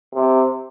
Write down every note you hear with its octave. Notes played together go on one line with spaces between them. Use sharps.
C3